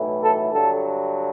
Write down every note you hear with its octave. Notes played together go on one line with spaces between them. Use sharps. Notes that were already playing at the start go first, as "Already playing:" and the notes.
Already playing: B1 A2 E3
A4
G2 D3 F#3 A4